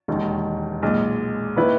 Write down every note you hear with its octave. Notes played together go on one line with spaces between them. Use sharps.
E1 D#2 D#3
B1 A#2 G#3
D#3 A#3 E4 B4